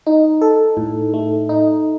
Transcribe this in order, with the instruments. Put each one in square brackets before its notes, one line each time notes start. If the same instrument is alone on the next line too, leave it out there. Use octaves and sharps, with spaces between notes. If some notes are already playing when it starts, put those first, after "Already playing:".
[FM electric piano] D#4
A4
A2
A3
D#4